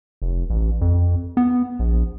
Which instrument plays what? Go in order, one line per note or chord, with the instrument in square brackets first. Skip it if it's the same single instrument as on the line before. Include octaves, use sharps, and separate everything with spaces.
[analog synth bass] F1
A1
F2
B3
A#1